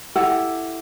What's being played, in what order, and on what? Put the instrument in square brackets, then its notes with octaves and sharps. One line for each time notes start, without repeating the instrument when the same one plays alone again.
[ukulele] E4 G4 A4 F#5